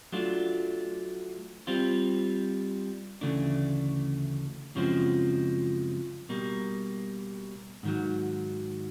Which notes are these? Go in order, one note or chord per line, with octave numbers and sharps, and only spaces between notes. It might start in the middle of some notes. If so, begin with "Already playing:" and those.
F#3 A3 D4 F4
G3 C4 F4
D2 C#3 E3 A3 D4
F#2 C#3 F3 G#3 C4
B2 G3 A#3
G#2 D#3 F#3